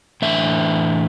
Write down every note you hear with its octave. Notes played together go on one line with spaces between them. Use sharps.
A2 E3 A3 D4 E5